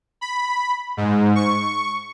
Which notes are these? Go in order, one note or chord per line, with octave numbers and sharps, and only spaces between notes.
B5
G#2
C#6